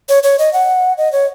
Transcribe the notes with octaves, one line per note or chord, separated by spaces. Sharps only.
C#5
C#5
D#5
F#5
D#5
C#5